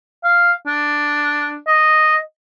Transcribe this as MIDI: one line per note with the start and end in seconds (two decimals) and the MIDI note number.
0.24 0.52 77
0.67 1.58 62
1.67 2.16 75